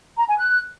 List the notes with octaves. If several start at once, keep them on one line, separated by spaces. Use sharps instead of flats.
A#5
G#5
F#6